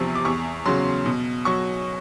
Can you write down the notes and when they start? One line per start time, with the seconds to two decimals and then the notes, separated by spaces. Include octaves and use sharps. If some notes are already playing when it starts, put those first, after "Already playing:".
Already playing: E2 C3 F3 C#6
0.15 D6
0.25 E2 C#6
0.66 C#3 F#3 C6
1.06 B2
1.45 F#3 C#6